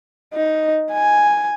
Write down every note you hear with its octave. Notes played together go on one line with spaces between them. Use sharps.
D#4
G#5